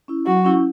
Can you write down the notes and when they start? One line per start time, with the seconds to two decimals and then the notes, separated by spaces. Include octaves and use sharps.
0.08 C#4 E4
0.26 F#3 F#4
0.45 C#4 E4